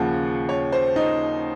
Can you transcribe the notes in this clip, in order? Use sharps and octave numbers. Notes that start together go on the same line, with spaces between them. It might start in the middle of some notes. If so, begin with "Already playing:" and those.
Already playing: D#2 C#3 F3 F#5
C#5
C5
D#4